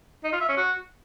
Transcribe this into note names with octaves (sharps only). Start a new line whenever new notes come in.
D#4
F4
E5
C#4
F#4